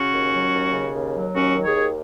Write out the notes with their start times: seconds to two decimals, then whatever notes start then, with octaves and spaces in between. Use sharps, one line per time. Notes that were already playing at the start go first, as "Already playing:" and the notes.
Already playing: C#3 C#4 F#4
0.14 D#2
0.34 F#3
0.54 D#2
0.74 C#3
0.95 D#2
1.14 F#3
1.34 D#2 C#4 F#4
1.55 D#3
1.64 G#4 C#5
1.75 D#2